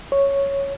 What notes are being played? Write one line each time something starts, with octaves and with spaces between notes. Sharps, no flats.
C#5